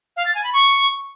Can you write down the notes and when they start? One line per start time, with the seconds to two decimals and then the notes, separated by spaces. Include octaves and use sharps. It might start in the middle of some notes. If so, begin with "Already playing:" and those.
0.16 F5
0.26 A6
0.35 G#5
0.44 B5
0.53 C#6